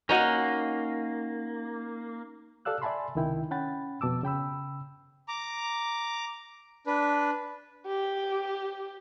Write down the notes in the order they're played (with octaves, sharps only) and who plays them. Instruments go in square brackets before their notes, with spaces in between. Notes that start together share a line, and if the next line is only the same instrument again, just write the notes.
[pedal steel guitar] A#3 [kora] C#4 D#4 F#4
[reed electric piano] G4 A4 D5 F5 E6 F#6
D5 E5 G#5 A5 B5 C6
C#2 C3 D#3 E4 G5
C#4 F#5 G5 B5 A6
F2 B2 A5 D6 E6
C#3 G5 B5 E6
[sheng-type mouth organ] A#5 D6
D4 B4
[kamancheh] G4